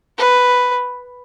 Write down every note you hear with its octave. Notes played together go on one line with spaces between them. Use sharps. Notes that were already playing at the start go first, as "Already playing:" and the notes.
B4